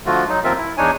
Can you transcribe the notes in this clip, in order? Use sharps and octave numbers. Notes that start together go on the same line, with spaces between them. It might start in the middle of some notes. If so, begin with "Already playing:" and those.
D3 F3 A3 F4 F#4
F#3 D#4
D#2 F3 C4 F4 A#4 E5
E4
E2 D4 D#4 C#5 G#5